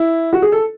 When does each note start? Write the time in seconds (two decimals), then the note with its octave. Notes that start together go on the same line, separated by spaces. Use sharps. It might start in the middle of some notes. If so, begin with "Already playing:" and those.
Already playing: E4
0.33 F#4
0.42 G#4
0.52 A4